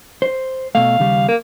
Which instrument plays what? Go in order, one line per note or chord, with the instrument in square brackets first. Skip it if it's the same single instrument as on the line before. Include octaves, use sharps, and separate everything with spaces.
[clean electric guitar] C5
[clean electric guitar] B2 A3 [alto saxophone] F5
[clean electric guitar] D#2 C#3 G3
[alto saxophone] A#3